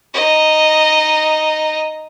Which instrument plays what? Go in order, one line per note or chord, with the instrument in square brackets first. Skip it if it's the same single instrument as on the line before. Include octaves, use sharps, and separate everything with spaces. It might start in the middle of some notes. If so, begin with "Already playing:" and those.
[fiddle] D#4 D#5